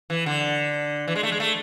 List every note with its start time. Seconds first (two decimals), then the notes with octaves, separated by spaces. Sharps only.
0.10 E3
0.26 D3
1.08 E3
1.15 G#3
1.23 A3
1.32 G#3
1.40 A3